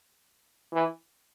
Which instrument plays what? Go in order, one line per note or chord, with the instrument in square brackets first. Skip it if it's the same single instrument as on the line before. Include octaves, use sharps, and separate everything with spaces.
[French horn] E3